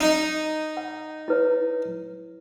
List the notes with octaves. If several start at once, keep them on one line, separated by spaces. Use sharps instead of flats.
D#4
F#5
E4 B4 C#5